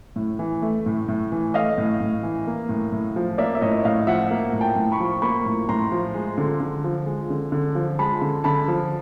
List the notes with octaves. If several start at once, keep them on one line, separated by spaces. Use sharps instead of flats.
A2
E3
A3
A2
A2
E3
A3 D#5 F5
A2
A2
E3
A#3
A2
A2
F3
A#3 D5 E5
E5
A2 C#5 D#5
A2 D#5 F5
F3 E5 F#5
A#3
A2
G5 A5
A2
B5 C#6
F3
A#3 B5 C#6
A2
A2 A#5 C6
F3
G#3
D3
D3
F3
G#3
D3
D3
F3
G#3 A5 B5
D3
D3 A5 B5
F3